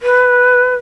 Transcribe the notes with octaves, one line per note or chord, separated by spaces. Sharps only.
B4